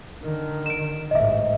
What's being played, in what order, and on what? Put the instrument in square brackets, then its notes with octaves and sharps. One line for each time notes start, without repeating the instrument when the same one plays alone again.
[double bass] D3 D#3
[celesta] D7 E7
[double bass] A1 G#2 [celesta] D#5 E5